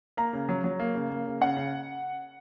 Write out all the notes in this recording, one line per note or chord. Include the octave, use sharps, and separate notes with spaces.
A#3 A#5
C#3
F#3
F#3
A#3
C#3
A#3
C#3
C#3 F#5
C#3